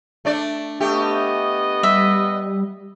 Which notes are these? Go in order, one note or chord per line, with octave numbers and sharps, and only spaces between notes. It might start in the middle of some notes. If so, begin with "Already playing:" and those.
A3 D4 D5
A3 B3 G4 D#5
G3 E5